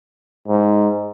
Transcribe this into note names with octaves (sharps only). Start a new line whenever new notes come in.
G#2